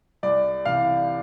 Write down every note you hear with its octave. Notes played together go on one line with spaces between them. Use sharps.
C2 D5
C3 E3 F5